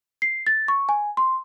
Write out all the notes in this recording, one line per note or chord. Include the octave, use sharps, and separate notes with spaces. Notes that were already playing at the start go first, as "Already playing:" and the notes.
C7
A6
C#6
G#5
C6